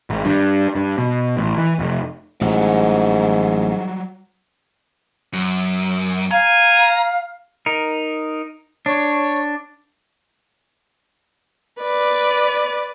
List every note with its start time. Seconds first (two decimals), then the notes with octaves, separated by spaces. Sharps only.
0.10 G#1
0.25 G2
0.75 G2
0.98 B2
1.37 A1
1.58 E3
1.79 F1
2.41 A1 G#2 F#3 G3 F#4
5.33 F#2
6.31 F5 G#5 A#5
7.66 D#4 A#4
8.86 D4 C#5
11.81 B4 D5